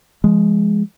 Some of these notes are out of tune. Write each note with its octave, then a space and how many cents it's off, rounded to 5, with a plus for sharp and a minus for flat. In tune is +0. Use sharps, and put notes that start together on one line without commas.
F3 -30 G#3 +0